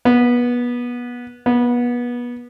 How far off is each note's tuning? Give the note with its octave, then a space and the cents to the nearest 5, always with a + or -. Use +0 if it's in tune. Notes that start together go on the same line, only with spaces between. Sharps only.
B3 -25
B3 -30